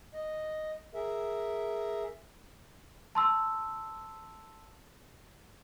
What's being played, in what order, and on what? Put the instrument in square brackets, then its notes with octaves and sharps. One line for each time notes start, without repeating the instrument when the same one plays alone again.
[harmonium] D#5
G#4 A#4 E5
[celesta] A5 C6 E6